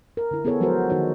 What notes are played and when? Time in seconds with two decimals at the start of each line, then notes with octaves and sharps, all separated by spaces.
0.17 A#4
0.31 D3 E4
0.45 B3 E4 G#4 A4 C#5
0.60 F3 F#3 G#3 F#4 A#4 C5
0.90 D#3 D#4 F#4 C#5